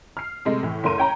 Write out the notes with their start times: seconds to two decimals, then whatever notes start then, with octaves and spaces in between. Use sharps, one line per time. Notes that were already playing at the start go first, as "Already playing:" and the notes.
0.17 F6 C7
0.45 C3 G#3 A3
0.63 A2 E3
0.84 F#1 A3 E4 A#4 C6 D#7
0.98 C#5 G5 A#5 B5